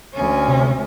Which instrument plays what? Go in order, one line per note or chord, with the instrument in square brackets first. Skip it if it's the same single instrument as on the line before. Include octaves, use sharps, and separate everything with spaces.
[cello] D2 C#4
[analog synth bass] C3